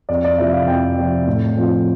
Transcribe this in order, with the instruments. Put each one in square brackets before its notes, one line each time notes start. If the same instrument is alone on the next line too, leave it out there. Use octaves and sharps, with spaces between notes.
[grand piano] F2 D5
D5
C3 F3 C4 E4 E5
F5
F2 G5
C3 F3 C4 E4
A2
F3 C4 F4